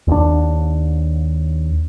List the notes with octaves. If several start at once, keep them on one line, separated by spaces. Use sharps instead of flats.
D#2 D4